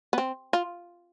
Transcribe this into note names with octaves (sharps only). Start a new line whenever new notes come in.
B3
C4
F4